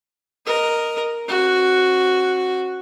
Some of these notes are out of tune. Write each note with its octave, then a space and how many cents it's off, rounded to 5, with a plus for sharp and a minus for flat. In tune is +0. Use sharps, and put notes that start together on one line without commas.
A#4 +0 D#5 -5
C4 +40 F#4 +0